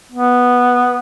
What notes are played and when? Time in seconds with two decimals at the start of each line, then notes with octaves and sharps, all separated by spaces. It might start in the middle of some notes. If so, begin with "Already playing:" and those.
0.12 B3